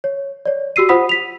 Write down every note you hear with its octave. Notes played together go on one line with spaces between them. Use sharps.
C#5
C#5 D5
F#4 G4 E6 C7 D#7
F4 C5 F#5 B5 D#6 B6
B6 F7